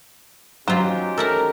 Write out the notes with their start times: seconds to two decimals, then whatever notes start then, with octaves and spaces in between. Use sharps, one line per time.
0.68 F#3 C#4 D#4 F4 G4 C5
1.18 A4 A#4 E5 F#5